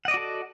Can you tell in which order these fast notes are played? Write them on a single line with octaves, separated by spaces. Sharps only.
F#5 D#5 D5 F#4 A4